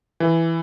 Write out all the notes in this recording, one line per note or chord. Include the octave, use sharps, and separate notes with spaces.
E3